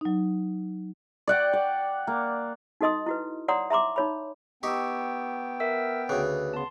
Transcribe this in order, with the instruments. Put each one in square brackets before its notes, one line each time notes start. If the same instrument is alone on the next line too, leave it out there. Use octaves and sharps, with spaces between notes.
[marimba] F#3 D#4
[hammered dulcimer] D5 F#5 G5
D5
A#3
[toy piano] D#4 F#4 A4 D#5 C6 D#6
E4 F#4 B4
C#5 D5 F#5 A#5 C6 D#6
E5 A#5 C6 D6
D#4 C#5 B5
[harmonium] B3 G5 [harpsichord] D#4 G4 [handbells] C#6 E6
[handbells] A#4 E5 E6
[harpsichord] D2 C#3 [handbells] B4
[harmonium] C#3 B3 [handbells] A5 C6